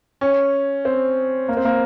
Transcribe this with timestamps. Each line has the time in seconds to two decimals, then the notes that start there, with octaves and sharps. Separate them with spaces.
0.21 C#4
0.85 C4
1.49 A#3
1.57 C4
1.65 A#3